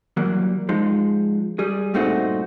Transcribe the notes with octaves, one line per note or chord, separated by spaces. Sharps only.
E3 F#3 G3 A#3
F3 G#3 D#4
G3 G#4
G2 A#2 A3 C4 D#4 F#4